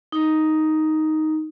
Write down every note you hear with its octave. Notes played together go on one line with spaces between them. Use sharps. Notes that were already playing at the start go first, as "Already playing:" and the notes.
D#4